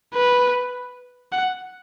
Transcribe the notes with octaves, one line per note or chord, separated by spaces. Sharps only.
B4
F#5